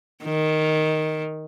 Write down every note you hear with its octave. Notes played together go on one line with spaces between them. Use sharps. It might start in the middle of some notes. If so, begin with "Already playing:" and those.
D#3